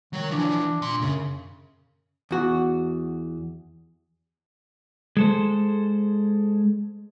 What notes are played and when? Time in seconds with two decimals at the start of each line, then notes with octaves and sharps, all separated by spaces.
0.13 D#3 F#3 C#5
0.31 E3 F3 D4
0.82 A#2 C6
1.02 F#2 C#3
2.31 E2 F#4
5.17 G#3 A4 C5